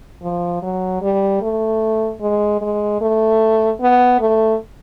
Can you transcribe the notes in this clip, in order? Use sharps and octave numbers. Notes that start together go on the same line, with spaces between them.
F3
F#3
G3
A3
G#3
G#3
A3
B3
A3